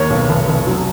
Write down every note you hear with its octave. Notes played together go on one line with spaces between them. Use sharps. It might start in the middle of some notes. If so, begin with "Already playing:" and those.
Already playing: D#2 A#3 C#5
B1
F1
F1
F#3